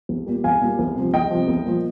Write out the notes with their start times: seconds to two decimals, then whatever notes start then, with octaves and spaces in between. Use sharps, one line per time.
0.09 C2
0.26 A#2 G3
0.44 C2 F5 G#5
0.61 A#2 G3
0.79 C2
0.96 C3 F3
1.13 C2 D#5 G5
1.30 C3 F3
1.48 C2
1.65 A#2 F3